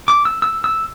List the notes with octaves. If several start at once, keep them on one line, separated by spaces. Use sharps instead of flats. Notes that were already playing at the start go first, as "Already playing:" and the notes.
D6
E6
E6
E6